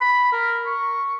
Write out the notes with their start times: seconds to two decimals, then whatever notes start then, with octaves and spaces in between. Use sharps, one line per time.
0.01 B5
0.32 A#4
0.66 C#6